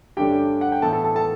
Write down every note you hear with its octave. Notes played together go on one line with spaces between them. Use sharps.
G2 D3 A3 C#4 G4 G5
F#5
G5
A2 E3 B3 A4 A5
A4 A5
A4 A5
A4 A5